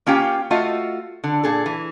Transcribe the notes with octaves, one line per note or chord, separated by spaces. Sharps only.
A#3 C#4 F4 G4 G5
A3 F4 F#4 D#5 F5
D3
A#2 G#4 A4
E3